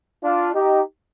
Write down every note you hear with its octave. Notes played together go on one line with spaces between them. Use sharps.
D4 F4
D#4 G4